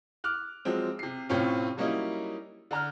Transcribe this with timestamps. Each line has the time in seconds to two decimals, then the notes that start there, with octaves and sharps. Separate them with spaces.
0.24 D6 F6 F#6
0.65 F3 F#3 G#3 C4
0.99 C3 C7
1.29 A2 C3 C4 C#4 F4
1.77 F#3 G3 A#3 C#4 D#4 E4
2.71 D3 A#5 F6